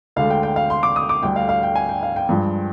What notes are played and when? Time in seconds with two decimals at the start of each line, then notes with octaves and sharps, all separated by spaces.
0.16 D2 D3 G#3 F5
0.30 G5
0.43 G5
0.56 F5
0.70 C6
0.83 D6
0.96 D#6
1.09 D6
1.23 D2 D3 G3 G5
1.36 F5
1.49 F5
1.63 G5
1.76 G#5
1.89 G5
2.03 F5
2.16 G5
2.29 G2 F3 G#3